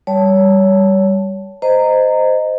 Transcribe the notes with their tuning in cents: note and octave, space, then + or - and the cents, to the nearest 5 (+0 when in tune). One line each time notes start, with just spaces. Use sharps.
G3 +0 C#5 +25 A5 +0
C5 -15 D#5 -5 A#5 -15